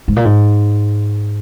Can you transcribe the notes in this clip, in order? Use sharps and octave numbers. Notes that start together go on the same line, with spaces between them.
G#2
A#2
G#2